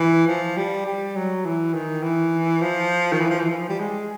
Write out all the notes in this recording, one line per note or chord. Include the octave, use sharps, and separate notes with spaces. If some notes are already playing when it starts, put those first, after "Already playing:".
Already playing: E3
F3
G3
G3
F#3
E3
D#3
E3
F3
D#3
E3
F3
E3
E3
F3
G3
G#3